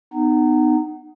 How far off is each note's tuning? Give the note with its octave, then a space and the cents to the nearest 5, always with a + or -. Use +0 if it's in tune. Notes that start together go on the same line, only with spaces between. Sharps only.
B3 +20 D#4 -20